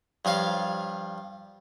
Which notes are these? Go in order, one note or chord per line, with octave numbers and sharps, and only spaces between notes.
G2 F3 C#5 F5